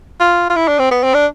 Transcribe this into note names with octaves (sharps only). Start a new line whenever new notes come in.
F4
F4
E4
D4
C4
B3
C4
D4